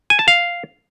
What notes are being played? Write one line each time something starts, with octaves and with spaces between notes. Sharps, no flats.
G#5
A5
F5